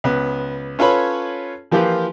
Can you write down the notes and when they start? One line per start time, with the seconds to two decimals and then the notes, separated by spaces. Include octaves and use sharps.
0.04 C#2 B3
0.79 C#4 F4 A4 B4 C#5 B5
1.71 E3 F3 A#3 F4 G4 B4